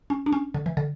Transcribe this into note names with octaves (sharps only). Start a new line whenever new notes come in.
C#4
D4
C#4
D3
E3
D3